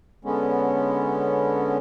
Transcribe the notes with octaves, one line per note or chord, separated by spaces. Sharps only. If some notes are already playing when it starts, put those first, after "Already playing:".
D3 G#3 B3 C#4